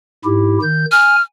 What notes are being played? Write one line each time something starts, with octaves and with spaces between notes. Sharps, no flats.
G#2 E4 G4
D#3 G6
G#5 F6